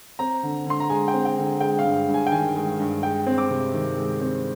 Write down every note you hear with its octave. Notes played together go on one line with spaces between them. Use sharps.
C4 A#5
D3
D3 C6
A#5
G#3 G#5
G5
C4
G5
D3
G#3 G5
F5
G2
G2
G#5
G5
D#3 G#5
G#3
G2
G#3 G5
C4
D6
C3
D#3
G#3
C4